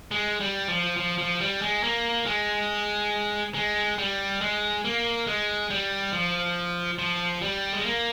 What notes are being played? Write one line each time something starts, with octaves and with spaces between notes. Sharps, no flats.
G#3
G3
F3
F3
F3
G3
G#3
A#3
G#3
G#3
G3
G#3
A#3
G#3
G3
F3
F3
G3
G#3
A#3